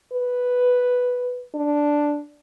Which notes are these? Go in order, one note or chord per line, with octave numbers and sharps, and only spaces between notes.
B4
D4